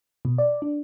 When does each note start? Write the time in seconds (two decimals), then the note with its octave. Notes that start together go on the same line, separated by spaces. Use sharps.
0.25 B2
0.38 D5
0.62 D4